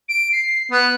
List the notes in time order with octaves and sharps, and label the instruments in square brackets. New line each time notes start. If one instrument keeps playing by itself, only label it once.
[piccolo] D7
C7
[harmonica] B3 [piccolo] F#6